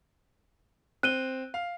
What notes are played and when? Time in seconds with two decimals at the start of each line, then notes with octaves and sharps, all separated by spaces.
1.03 C4 F#6 D#7 G7
1.54 F5